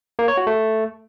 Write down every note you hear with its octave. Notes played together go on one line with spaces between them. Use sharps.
A#3
C#5
F#4
A3